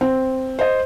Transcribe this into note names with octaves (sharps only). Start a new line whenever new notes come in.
C4
C5 D#5